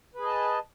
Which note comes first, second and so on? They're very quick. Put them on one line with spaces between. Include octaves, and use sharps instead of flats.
B4 G#4 D#5 A5